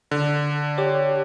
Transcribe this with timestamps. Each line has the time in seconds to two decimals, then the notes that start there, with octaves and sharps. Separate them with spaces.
0.11 D3
0.78 G4 C#5